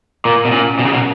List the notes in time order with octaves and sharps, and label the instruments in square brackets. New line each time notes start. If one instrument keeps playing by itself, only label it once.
[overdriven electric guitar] A#2 [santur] A#3
[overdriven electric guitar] B2
[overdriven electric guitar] A#2 [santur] C#4
[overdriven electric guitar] B2 [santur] F#3
[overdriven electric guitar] C#3
B2